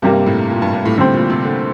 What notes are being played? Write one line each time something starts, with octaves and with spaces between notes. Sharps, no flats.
G2 C3 G3 A#3
A2
A#2
G2
G2
A2
A2 D3 G3 C4
A#2
C3
D3